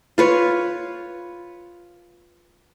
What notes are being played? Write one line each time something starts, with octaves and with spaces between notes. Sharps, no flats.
F4 B4 C#5